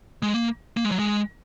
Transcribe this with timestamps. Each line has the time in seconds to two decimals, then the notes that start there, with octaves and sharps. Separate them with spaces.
0.23 G#3
0.34 A#3
0.77 A#3
0.85 G#3
0.91 F#3
0.99 G#3